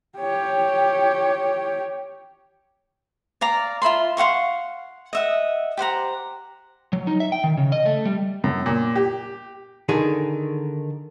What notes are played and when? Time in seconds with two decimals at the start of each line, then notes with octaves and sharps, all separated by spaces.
0.18 G4 C#5
3.41 D5 F5 A#5
3.82 F4 E5 B5 C6
4.17 F5 F#5 C6 C#6
5.13 D#5 E5 F#5
5.77 G4 C5 F#5 A#5
6.93 F#3
7.07 D#4
7.20 E5
7.32 G5
7.44 D#3
7.57 C#3
7.72 D#5
7.86 A3
8.05 G3
8.44 F#2
8.66 A#2
8.96 G4
9.89 D3 D#3 G#4